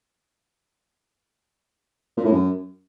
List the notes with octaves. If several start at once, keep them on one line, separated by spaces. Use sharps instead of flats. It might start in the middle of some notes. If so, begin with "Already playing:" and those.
A#2
A2
F#2